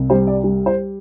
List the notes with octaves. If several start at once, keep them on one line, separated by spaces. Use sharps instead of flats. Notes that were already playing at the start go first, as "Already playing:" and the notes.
Already playing: C2
G3 C5
D5
G3
C5